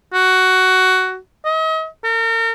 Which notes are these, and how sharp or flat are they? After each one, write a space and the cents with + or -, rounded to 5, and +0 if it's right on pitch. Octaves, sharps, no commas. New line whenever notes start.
F#4 +10
D#5 +40
A#4 -40